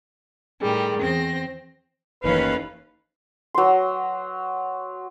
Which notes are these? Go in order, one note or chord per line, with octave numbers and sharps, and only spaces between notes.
A2 D#3 G3 G#4
E2 C4 A#6
F#1 D#2 C3 E3 A3 C#4 B4 F5
F#3 C6